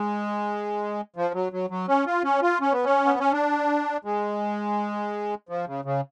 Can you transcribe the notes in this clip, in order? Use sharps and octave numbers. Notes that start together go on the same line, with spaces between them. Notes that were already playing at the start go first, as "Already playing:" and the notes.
Already playing: G#3
F3
F#3
F#3
F#3
C#4
F4
C#4
F4
C#4
B3
C#4
B3
C#4
D4
G#3
F3
C#3
C#3